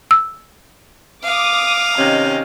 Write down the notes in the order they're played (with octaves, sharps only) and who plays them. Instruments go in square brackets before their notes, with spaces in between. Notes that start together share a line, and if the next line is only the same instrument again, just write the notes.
[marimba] E6
[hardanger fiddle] F5 [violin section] D6 D#6
[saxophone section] C3 D#3 C#4 [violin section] D#5